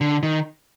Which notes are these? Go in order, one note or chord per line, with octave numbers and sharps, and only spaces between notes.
D3
D#3